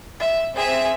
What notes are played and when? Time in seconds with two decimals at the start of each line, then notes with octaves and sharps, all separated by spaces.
0.20 E5
0.56 C4 G#4 E5